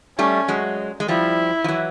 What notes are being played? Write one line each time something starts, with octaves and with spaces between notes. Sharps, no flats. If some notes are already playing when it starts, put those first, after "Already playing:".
G3 A3 C#4
F#3 G#3
G#3
F3 G3 E4
F3
E3 F#3